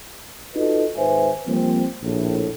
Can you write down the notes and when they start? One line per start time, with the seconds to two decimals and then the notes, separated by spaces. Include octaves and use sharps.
0.56 D#4 F4 F#4 A4 B4 D#5
0.97 G#1 G#2 B4 C5 E5 G#5
1.48 F3 G3 A#3 C4
2.03 A#1 A2